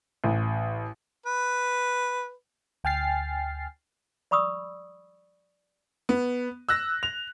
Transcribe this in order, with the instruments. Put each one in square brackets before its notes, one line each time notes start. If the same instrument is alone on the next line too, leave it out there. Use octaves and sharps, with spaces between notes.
[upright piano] A1
[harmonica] B4
[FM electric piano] D2 G5 G#5 F6 A6 C7
[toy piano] D5 B5 C#6 D#6 E6
[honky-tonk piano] B3
E6 F#6 A#6
F7